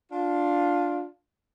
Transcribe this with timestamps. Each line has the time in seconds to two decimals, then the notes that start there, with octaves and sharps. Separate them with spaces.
0.12 D4 F4